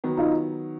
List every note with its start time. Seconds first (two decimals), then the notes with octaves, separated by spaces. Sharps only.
0.04 D#3 F#3 B3
0.17 D#4 F4